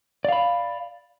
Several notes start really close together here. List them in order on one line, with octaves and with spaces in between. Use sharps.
D5 F5 B5